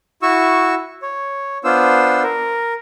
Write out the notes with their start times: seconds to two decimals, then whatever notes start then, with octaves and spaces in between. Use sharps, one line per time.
0.22 E4 F#4 C#6 E6
1.02 C#5
1.64 B3 D4 F4 C5 E6
2.23 A#4